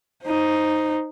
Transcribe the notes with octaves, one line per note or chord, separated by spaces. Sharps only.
D#4 C5